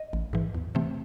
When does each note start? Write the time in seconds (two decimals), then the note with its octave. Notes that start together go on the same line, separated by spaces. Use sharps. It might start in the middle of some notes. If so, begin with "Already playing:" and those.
Already playing: D#5
0.13 A1
0.33 G#2 E3
0.55 E2
0.75 C3 E3 A3 C4